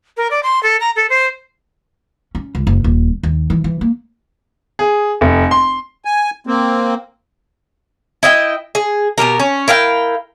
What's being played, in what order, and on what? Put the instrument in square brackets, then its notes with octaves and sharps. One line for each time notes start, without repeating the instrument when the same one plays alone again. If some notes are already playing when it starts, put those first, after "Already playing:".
[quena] A#4
D5
C6
A4
A#5
A4
C5
[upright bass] C#4
C#2
F#1
D#1
D#2
E3
E3
A#3
[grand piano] G#4
F1
C6
[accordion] G#5
A#3 C4
[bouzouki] E4 D#5 E5 G5
G#4
B2 F#3 G4 A#4
C#4
E4 A#4 F5 G5